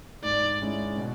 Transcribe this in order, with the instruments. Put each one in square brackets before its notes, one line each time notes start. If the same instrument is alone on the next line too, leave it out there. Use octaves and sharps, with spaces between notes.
[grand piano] G#2 [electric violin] D5
[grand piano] G#3 C#4 E4
B2